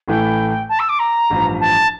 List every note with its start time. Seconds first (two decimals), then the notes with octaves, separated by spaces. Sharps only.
0.08 A1 A2 E3 A3 E4 G5
0.69 A5
0.79 E6
0.89 D6
0.99 A#5
1.30 A1 G2 F3
1.60 A5